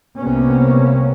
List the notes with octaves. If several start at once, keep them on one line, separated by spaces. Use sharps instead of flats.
C2 C3 A#3 B3 C#4